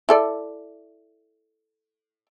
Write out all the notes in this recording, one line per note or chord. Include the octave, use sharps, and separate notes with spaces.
E4 A4 D5